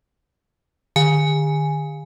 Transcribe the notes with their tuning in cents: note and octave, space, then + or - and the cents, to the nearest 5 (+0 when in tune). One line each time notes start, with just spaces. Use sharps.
D3 +45 G#5 +0